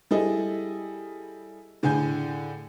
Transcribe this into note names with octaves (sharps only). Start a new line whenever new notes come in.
G3 E4 G#4 A4 D#5
A2 D3 G#4 G#5 G6